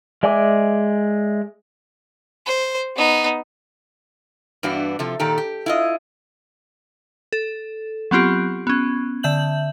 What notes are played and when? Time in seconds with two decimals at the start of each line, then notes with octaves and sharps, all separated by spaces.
0.23 G#3 D5 E5 G#5 D6
2.46 C5
2.96 B3 D#4
4.63 G2 E3 B3 D4 F#4
4.99 C3 F3 A4
5.19 A#2 D#3 G4 A4
5.38 G4
5.66 E4 F4 D#5
7.33 A4
8.11 F#3 B3 C4 F4 G4
8.67 B3 C#4
9.23 D3 E5 G6 F#7